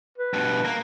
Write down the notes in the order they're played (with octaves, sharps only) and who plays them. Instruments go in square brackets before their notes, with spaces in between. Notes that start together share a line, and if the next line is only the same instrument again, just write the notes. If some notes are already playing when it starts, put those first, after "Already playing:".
[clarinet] B4
[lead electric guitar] G2 B2
A#3